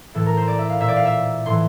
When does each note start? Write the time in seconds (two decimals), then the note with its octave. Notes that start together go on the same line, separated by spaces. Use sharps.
0.15 A2 E3 A4
0.26 A#4
0.37 C5
0.48 D5
0.59 E5
0.70 F5
0.80 A#2 E5
0.88 D5
0.97 F5
1.05 E5
1.46 A2 E3 C6